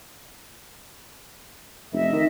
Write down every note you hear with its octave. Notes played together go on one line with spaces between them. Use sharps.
F1 D#5 E5
D#3